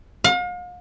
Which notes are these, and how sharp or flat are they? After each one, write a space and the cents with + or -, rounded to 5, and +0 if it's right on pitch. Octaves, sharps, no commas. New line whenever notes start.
F5 +40